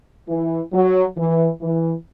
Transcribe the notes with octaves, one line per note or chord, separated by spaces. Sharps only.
E3
F#3
E3
E3